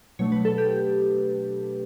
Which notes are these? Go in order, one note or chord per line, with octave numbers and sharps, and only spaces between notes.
B2 F#3 A3 D4 C#5
B4
A4
G4